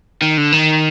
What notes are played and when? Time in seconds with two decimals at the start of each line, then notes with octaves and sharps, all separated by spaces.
0.22 D#3
0.38 D3
0.53 D#3